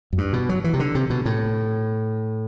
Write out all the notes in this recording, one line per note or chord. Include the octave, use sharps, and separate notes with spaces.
F#2
G2
B2
F#3
E3
C3
D3
C3
B2
A2